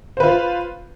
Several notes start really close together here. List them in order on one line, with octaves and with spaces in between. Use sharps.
C5 B4 F4